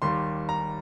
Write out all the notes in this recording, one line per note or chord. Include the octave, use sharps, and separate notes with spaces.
D#2 D#3 G3 C6
A#5